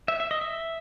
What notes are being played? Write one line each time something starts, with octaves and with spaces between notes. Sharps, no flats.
E5
E5
D#5
E5